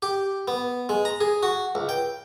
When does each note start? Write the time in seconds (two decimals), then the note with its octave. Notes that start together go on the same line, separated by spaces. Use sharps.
0.02 G4
0.48 B3
0.89 G#3
1.05 A#5
1.21 G#4
1.43 F#4
1.75 C#2
1.89 G5